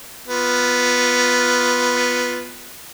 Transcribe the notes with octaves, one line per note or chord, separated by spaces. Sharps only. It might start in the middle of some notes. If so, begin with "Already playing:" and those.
B3 F4